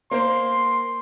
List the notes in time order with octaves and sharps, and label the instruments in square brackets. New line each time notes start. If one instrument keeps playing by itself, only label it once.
[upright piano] A#3 A#4 C5 [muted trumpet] C6